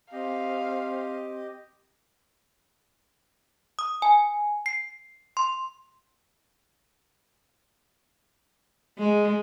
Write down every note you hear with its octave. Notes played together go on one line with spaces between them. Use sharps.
C4 G4 D#5 F5
D#6
G#5
C7
C6
G#3